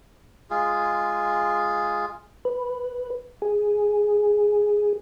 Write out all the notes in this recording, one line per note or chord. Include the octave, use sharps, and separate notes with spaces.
G#3 F4 G#4
B4
G#4